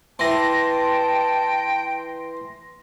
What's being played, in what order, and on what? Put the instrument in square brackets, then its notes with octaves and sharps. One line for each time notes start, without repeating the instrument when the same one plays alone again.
[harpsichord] E3 [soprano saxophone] G5 [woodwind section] A5 [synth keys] C6 A#6